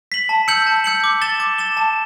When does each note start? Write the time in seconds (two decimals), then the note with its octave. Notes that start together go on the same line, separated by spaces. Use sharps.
0.12 B6 F#7
0.29 A5
0.48 E6 G6 C#7 F#7
0.67 A5
0.84 E6 G6 C#7 F#7
1.04 D6
1.22 A6 E7 G7
1.40 D6
1.58 A6 E7 G7
1.77 A5